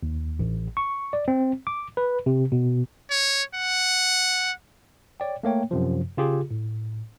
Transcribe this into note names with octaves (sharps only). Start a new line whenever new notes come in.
D#2
A1
C#6
D5
C4
D6
B4
C3
B2
C#5
F#5
C#5 D5 G5
A3 A#3 C#5 G5
F#2 C3 F3
C#3 F4 G4 G#4
A2